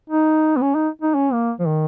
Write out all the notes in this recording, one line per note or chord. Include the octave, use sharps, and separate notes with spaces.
D#4
B3
C#4
D#4
D#4
C#4
A#3
F3
D#3